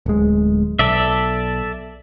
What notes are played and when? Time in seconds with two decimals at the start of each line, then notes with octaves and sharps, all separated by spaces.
0.06 D1 G#3
0.79 B1 A4 D5 E5